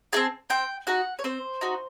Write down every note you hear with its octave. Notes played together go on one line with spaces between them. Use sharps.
C4 D#4 G#4 A5
C4 G5
D#4 F#4 F#5
C#5
C4 C5
D#4 F#4